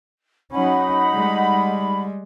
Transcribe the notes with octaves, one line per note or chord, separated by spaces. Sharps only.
F#3 C#4 D#4 F#5 B5
G3 G#3